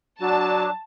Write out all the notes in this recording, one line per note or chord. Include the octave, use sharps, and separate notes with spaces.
F#3 D4 F#4 A5